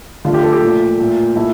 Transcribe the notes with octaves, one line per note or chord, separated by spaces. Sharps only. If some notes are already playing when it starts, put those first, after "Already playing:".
D3 F3 A3 F4
G4
A4
G4
A#2 F3 A3
A#2 A3
A#2 A3 E4